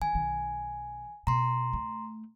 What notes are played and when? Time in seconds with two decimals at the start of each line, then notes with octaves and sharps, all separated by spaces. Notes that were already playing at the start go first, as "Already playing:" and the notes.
0.02 D#3 G#5
0.15 B1 D#3
1.27 B2 A#5 C6
1.73 A3